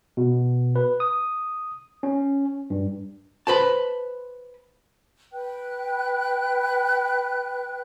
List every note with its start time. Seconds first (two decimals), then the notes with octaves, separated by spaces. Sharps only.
0.17 B2
0.76 B4
1.00 D#6
2.03 C#4
2.70 G2
3.47 B4 C5 A5
5.32 B4 G5 F#6